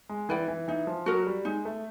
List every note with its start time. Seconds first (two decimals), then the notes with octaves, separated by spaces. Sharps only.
0.09 G#3
0.29 E3 B4 D5 G5
0.48 E3
0.68 E3 D#4
0.87 F3
1.06 F#3 F#4 A#4
1.27 G3
1.45 G#3 D#4
1.65 A3